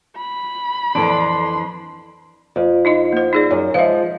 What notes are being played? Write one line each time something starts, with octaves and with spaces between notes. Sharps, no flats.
B5
F2 E3 D4 A4 C6
F2
D#4 E4 D#5
A#3 C5
D#4 G#4 D5
F#2
F3 G#3 E5 F5